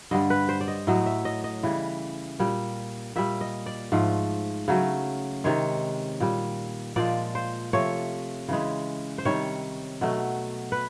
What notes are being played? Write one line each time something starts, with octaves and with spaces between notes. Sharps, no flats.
G2 D3 G3 D#5
B4
C5
D5
D#5
A2 F#3 A3 D#5
E5
D#5
D#5
C#3 E3 G3
A#2 G3
A#2 G3 E5
D#5
D5
G#2 F3 A3
C#3 F#3 A3
C3 D#3 G#3 C#5
A#2 G3
A#2 F3 G#3 D5
C5
C3 F3 A3 C#5
C#3 E3 G#3
C5
C3 D#3 G3 C#5
B2 F#3 A3
B4